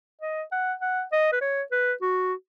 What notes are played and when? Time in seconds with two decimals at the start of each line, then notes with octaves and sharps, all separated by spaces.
0.22 D#5
0.52 F#5
0.81 F#5
1.12 D#5
1.33 B4
1.42 C#5
1.72 B4
2.02 F#4